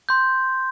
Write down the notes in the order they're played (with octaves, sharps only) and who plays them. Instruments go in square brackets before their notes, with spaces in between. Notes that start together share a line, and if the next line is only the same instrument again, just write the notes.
[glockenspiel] C6 G6